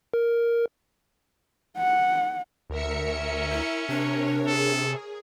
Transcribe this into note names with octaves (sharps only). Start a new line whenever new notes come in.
A#4
F#5
D2 A#4 E5 C#7
C#4
E4
C3 D4 A#4 C#5
G#4 A4